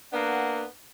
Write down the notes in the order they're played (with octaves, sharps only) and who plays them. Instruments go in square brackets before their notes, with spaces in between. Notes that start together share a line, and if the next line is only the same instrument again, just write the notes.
[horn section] A#3 B3 D4 F#5